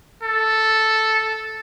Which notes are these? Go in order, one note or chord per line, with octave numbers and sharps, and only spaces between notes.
A4